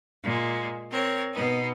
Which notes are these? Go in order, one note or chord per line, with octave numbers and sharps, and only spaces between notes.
A#2 G#3
C4 A#4 C#5
B2 B3 D#4